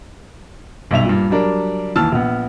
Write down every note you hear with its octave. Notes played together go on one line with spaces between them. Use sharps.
B1 G2 E5 F7
G2 A#2
F#3 G3 D4 A#4
D#2 E3 A5 E6 F6
A#1 B3